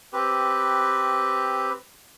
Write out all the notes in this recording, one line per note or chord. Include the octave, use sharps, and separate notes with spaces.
C4 G4 B4